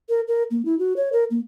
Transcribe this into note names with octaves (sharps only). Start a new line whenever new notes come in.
A#4
A#4
A#3
E4
F#4
C#5
A#4
A#3